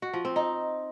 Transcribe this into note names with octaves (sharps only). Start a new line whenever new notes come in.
F#4
F3
C4
D#4